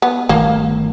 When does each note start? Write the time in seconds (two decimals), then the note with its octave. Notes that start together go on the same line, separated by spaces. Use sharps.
0.02 B3
0.29 G1 D#3 A3 A#3